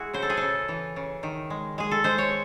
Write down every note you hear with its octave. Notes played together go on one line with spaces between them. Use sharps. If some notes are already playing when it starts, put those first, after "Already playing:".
Already playing: G#3 E4 F#4 G#4
C#3 C5
A4
G#4
C#3 A4
E3
C#3
D#3
G#3
G#3 G#4
A4
G#3 C5
C#5